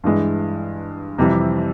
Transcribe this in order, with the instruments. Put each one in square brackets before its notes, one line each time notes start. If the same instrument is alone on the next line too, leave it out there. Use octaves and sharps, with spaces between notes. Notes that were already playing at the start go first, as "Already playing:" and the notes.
[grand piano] G2 E3 G#3
F2 C3 E3 G3